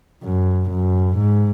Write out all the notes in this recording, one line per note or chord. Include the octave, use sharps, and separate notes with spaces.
F#2
F#2
G#2